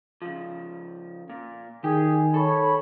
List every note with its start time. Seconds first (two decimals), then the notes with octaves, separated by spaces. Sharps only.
0.22 C#3 F3
1.29 A#2
1.84 D#3 G4 G#4
2.34 A4 C#5 B5